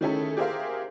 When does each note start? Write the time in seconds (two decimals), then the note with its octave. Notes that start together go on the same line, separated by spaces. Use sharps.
0.01 D#3 A3 C#4 E4 G#4 A4
0.37 G4 G#4 A#4 C5 E5 F5